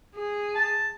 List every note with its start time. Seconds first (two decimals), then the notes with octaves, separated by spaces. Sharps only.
0.15 G#4
0.55 A5